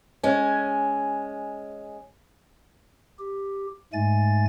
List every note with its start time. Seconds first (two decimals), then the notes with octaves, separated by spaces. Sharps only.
0.23 G#3 C#4
3.19 G4
3.93 G#2 G#3 A3 G#5 A6